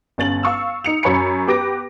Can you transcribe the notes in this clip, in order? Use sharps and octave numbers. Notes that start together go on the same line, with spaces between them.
G1 C#4 A6 F#7
F5 C#6 E6
D#4 C#7 F7
F#2 C#5 G#5 B5 C#7
B3 G4 B4 D6 A#6 D7